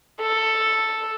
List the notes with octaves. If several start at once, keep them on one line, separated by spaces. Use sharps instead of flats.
A4